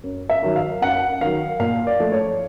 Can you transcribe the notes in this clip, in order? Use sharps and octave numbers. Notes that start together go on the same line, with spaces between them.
F#2
E5
D#3 F#3
F5
F#2 F#5
D#3 F#3 F5
A#2 F5
D5
F3 A3
C#5